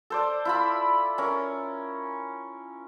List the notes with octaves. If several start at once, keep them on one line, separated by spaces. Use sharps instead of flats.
A4 C5 D5
E4 F4 B5
C#4 A#4